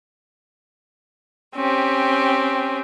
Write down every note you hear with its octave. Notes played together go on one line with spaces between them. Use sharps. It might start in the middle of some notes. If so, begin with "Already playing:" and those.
C4 C#4 G4